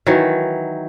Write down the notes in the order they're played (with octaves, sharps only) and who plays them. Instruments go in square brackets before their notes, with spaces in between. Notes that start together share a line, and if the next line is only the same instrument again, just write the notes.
[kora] D#3 E3 F#3